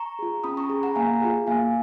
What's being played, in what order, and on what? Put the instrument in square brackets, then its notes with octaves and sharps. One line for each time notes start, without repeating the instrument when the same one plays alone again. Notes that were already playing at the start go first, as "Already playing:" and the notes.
Already playing: [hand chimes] A#5 C#6
F4 G#4
C#4 B5 D#6
A#5 C#6
G#4
F#5 A#5
A#3 F5 G#5
F4 G#4
A#3 F5 G#5